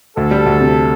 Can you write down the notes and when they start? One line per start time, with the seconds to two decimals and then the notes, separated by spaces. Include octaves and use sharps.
0.17 D2 A4
0.31 G3
0.46 D2
0.61 C3